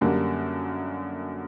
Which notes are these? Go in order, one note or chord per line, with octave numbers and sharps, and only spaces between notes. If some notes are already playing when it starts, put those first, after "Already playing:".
F#2 D3 G3 A#3 D4